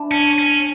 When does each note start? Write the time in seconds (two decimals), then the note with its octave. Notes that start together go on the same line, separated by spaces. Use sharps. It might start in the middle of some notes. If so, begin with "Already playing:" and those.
Already playing: D4 E4
0.12 C#4
0.39 C#4